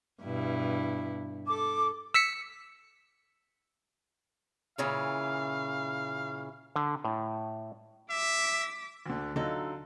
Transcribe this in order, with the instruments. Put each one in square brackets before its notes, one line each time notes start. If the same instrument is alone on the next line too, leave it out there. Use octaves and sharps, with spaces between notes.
[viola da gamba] G2 B2 E4
[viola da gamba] A4 [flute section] D6
[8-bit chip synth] E6 B6 C#7
[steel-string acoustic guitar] A#2 C#3 E3 [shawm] F5
[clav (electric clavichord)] D3
A2
[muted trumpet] E5 [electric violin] D6 B6
[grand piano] D2 D3
[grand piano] D3 F#3 F4 [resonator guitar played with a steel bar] D#4 A4